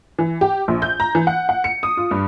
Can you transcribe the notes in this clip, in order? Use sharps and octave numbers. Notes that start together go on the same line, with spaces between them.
E3
G4
A#1
G6
A#5
E3
F#5
F#5
C#7
D#6
F4
G2